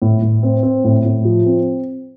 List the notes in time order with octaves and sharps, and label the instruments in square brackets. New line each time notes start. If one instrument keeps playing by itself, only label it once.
[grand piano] A2
A2
C4
C4
A2
A2
F3
C4